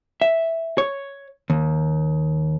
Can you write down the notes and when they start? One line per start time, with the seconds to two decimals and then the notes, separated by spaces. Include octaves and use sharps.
0.22 E5
0.78 C#5
1.50 D#2